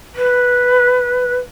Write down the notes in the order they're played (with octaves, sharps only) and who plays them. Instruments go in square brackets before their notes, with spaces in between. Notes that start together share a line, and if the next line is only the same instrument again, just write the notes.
[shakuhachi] B4